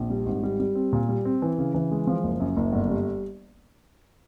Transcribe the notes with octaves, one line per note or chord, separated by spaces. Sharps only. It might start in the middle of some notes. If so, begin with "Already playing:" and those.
Already playing: A#1
G3
G#1
G3
G3
C4
A#2
G3
C4
E3
C#3
E3
G#3
F3
F#1
F#2
F#1
G1
G3